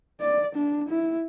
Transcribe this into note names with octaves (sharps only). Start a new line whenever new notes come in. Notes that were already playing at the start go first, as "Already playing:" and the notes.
D5
D4
E4